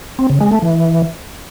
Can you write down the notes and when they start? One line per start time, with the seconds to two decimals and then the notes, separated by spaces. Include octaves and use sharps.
0.19 C4
0.30 C#3
0.41 G#3
0.52 A3
0.62 E3